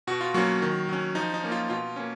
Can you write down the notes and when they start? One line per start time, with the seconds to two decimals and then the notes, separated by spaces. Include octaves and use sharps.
0.07 B2 F#4
0.21 F4
0.34 F#3 A#3 C#4 F#4
0.62 D#3
0.89 F#3 C#4
1.15 F3 D#4
1.34 D#4
1.43 A#3 C#4
1.52 F4
1.70 B2 F4
1.96 A#3 C#4